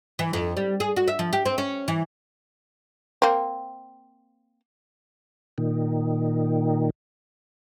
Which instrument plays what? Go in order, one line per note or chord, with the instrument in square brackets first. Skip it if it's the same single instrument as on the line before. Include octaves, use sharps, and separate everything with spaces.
[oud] E3
F2
G3
G#4
F#4
E5
F3
G4
C4
C#4
E3
[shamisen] A#3 C4
[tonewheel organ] A#2 D#3